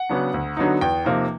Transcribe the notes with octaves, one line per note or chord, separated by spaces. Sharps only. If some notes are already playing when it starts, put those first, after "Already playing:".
Already playing: F#5
C#3 F#3 B3 D4
D2
D3 F#3 B3 D#4
E2 G5
C3 F3 A#3 D#4